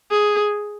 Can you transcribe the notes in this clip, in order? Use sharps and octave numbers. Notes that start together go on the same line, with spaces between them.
G#4